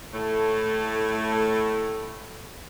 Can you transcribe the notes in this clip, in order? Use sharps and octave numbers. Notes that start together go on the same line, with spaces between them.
A2 A3